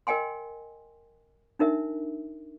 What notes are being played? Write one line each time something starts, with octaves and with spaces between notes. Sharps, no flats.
A#4 D#5 G5 G#5 C6
D4 D#4 A#4 E5